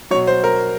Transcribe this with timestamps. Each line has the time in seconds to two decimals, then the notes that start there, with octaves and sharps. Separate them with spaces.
0.11 F#3 C#5
0.14 B2
0.27 C5
0.44 A#4